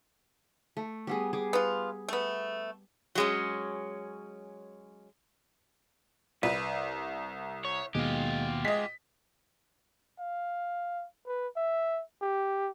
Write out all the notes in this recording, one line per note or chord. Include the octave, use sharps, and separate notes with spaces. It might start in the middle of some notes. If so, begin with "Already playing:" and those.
A3
G3 B3 G#4
G3 G#4 D6
B3 F4
A3 B3
F#3 G#3 C#4
C2 B4
C#5
D#2 B2 G#3 F4 G4
G#3 D#5 B6
F5
B4
E5
G4